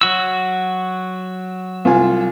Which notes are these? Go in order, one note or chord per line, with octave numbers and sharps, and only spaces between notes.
F#3 F#4 E6
C2 F4 G#5